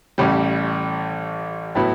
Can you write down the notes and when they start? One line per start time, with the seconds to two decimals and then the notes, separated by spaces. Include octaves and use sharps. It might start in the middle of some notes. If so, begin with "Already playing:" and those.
0.18 A1 A2 G3
1.75 A2 F#3 B3 E4